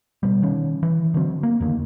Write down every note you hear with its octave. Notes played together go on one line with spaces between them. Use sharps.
B2 G3
D#3 C#4
E3
D3 F#3 C4
A#3
E2 D3 D#3 A#3